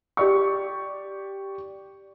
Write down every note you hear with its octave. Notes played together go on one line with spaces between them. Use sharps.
G4 D5 C#6